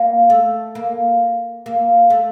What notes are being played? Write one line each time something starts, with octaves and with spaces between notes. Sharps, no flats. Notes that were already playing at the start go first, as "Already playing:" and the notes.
Already playing: A#3
A3
A#3
A#3
A3